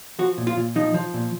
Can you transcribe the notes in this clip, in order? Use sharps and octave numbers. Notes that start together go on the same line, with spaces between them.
F3 F#4
A#2
F4
A#2
F3 D#4
F3
A#2